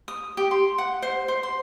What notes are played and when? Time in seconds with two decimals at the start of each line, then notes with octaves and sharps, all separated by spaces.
0.08 D#6
0.37 G4
0.51 C6
0.78 F#5
1.02 C5
1.28 C5
1.43 C6